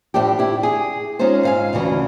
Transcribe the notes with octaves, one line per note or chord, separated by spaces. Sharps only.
A2 F3 A3 D4 G4
E4 G4
G#4
G#3 C#4 D#4 F4 C5
G#2 F5 G#5
D2 C#3 E3 F#4